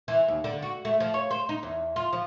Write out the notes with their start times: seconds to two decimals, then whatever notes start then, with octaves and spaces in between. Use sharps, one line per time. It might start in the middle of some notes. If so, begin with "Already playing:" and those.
0.08 E3
0.28 D#2
0.44 D3
0.62 F#4
0.85 A3
1.00 F3
1.14 C#5
1.31 C5
1.49 D#4
1.63 E2
1.96 F4
2.13 F3